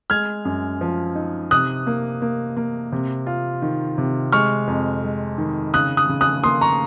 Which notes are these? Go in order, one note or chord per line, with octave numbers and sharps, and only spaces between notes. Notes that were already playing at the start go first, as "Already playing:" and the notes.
G#3 F6 G#6
F#2
F3
D#4
C3 D#6 F#6
A#3
A#3
A#3
C3
F4
D#3
C3
G#3 C#6 F6
F2
G#3
D#3
C#3 D#6 F#6
D#6 F#6
C#3
D#6 F#6
A#3 C6 D#6
A#5 C#6